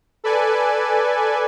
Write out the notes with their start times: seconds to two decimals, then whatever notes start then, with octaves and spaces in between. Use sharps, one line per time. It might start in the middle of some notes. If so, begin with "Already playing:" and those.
0.24 A4 B4 D5 G#5